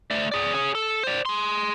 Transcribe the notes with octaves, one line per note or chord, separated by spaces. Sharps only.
A3 D5
G#4 D5
G#4 C#5
A4
C5 D5
G#4 C6